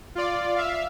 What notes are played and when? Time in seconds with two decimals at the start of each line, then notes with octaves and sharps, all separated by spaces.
0.15 F4 D5
0.55 E5 F5